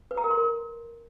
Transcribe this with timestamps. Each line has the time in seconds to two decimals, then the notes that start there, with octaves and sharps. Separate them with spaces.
0.11 B4
0.17 A#5
0.24 A#4
0.31 C6
0.37 A#4